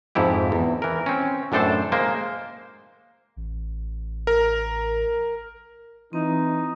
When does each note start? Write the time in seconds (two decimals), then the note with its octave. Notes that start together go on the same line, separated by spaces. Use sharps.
0.15 F2 G#2 E4 G4
0.52 E2
0.82 E3 A#4
1.06 C4 C#4
1.52 F#2 A2 D4 A4 C5 A5
1.92 G#3 A#3 C5
3.36 A1
4.27 A#4
6.13 E3 C4 D#4